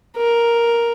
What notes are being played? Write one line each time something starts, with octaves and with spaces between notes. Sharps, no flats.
A#4